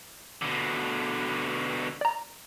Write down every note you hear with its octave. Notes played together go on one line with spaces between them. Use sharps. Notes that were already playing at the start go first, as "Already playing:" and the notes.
B2 D3
D5 A#5